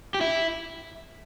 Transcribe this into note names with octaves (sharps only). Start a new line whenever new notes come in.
G4
E4